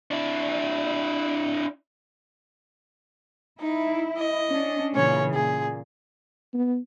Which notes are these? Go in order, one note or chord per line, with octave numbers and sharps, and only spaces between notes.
D4 E4
D#4 E4
D#5
C#4 D4
A#2 C#3 E3 C#4 C#5
A#2 G#4
B3